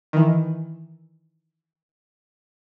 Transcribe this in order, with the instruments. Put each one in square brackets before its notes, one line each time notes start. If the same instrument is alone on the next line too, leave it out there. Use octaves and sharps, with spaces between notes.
[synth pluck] D#3 E3